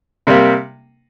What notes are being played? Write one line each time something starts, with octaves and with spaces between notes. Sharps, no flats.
C3 G3 A#3